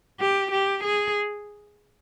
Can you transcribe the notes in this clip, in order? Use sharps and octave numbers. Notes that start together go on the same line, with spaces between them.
G4
G4
G#4